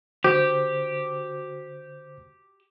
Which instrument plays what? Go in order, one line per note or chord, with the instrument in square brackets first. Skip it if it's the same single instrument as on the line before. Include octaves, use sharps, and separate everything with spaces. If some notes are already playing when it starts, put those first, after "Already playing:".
[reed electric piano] D3 C5 [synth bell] F#4 [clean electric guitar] G4